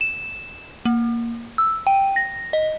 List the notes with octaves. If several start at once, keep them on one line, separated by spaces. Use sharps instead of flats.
E7
A#3
E6
G5
A#6
D#5